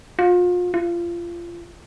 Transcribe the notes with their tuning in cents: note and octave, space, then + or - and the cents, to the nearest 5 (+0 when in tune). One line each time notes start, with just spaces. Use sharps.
F4 +35
F4 -25